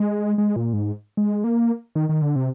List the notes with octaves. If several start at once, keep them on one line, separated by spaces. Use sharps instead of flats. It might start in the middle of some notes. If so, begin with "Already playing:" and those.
Already playing: G#3
G#3
A#2
G#2
G#3
A#3
D#3
D#3
D3
C3